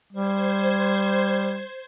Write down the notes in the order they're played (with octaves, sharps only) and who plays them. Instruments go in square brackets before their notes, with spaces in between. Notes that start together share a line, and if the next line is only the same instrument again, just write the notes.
[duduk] G3 [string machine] C5 G#6